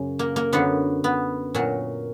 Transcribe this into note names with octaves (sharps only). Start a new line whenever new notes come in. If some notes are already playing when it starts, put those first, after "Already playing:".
Already playing: F#2 C#3
A#3
A#3
F#2 D3 F#3 B3
B3
A#2 F#3